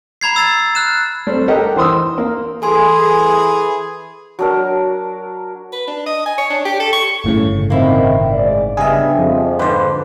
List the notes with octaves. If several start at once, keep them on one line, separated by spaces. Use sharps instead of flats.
A#5 B5 G#6 C7
E6 A6 C7
F6 F#6 E7
G3 A3 C4
G4 A4 A#4 D#5 F#5 G5
E3 C5 C6 D#6 E6
A#3
E3 G#4 A4 G#5 C6
F#3 D4 A#4
B4
D4
D#5
G#5
C#5
D4
G4
A4
C#6
G1 A2 C#3
D#3 A#3 C4 E4
G#2 D5
C#3 G3 B3 D4 G#4 D#5 E5
F2 F3
G#2 D3 B4 C5